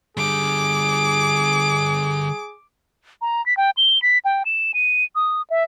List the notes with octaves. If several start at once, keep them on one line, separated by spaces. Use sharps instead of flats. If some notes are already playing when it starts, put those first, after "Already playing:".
D3 G3 G#4 D6
A#5
B6
G5
G7
B6
G5
E7
D#7
D#6
E5